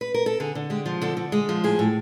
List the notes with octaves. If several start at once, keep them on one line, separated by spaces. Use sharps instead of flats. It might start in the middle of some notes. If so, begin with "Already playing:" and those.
B4
A#4
A4
D3 G#4
D3
G#3 G4
F3
D3 A4
D3
G#3 G#4
F3
A2 G#4
A2